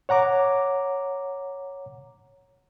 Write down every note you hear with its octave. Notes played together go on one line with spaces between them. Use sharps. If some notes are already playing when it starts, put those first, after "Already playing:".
C#5 F#5 A#5 D6